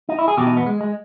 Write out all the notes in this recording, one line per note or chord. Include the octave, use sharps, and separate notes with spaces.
D#4
E4
G#4
E2 B2 G4
D#4
B3
G#3
G#3